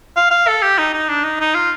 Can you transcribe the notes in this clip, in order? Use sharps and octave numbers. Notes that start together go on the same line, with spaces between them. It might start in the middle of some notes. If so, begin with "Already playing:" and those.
F5
F5
A4
G4
D#4
D#4
D4
D#4
D#4
F4